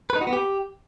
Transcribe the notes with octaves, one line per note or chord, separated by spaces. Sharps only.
B4
D#4
F#4
B3
G4